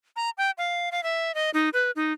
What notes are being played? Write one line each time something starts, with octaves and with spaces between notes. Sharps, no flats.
A#5
G5
F5
F5
E5
D#5
D#4
B4
D#4